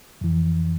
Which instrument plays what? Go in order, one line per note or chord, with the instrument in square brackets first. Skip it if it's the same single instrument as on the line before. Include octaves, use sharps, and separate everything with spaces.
[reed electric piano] F2 E3